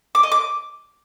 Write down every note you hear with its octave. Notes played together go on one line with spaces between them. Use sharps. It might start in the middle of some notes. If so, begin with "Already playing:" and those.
D6
D#5
D6